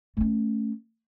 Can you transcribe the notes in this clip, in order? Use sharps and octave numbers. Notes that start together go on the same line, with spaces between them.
A3 C#4